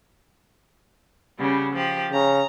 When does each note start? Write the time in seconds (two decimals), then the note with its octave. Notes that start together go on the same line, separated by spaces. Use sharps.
1.38 C#3 G3 B3
1.73 F3 G4
2.12 C#3 A#5